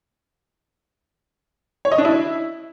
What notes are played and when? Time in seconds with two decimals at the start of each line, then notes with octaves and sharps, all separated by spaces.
1.85 C#5
1.92 D#5
1.98 D4
2.05 E4